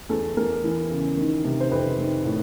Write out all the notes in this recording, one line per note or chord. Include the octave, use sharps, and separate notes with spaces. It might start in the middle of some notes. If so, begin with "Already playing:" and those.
E2 A4
E2 A#4
E3
C#3
D#3
C3
C5
F2 B4
D#3
A2